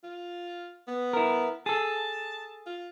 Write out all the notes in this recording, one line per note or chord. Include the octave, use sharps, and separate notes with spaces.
F4
B3
E4 A#4
G#4 A4 A5
F4